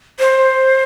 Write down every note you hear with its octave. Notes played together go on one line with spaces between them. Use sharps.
C5